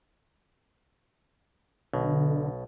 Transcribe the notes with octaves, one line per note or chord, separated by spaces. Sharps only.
B1 B2 D3